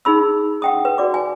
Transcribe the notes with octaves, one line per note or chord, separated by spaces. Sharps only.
D#4 G#4 B5 E6
F#5 G5 D#6
B4
F#4 D5 D6
G#5